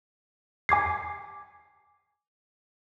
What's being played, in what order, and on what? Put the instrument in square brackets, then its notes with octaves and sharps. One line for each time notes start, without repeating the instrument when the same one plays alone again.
[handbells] G#5 D6 G#6 C7